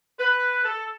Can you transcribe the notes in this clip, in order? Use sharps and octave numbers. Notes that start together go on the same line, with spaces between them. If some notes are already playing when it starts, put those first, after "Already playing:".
B4
A4